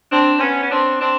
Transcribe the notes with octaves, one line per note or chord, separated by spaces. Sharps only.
C4 D4
C4
B3 C#4
C#4
C4 D4
C4 D4